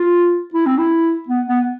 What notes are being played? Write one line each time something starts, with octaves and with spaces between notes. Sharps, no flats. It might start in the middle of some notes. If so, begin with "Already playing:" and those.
Already playing: F4
E4
C4
E4
B3
B3